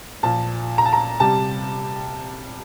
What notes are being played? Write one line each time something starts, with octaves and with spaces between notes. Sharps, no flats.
A#2 F3 A5
A#5
A5
A#5
C3 G3 A5